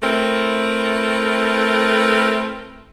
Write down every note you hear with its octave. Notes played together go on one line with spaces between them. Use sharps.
A3 C4 E4 A#4 B4